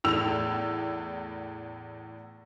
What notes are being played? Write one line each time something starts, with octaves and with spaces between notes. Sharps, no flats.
E2 A2 E6 F7